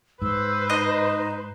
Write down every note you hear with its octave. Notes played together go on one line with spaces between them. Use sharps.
G#2 B4 C5 E6
D#4 D#5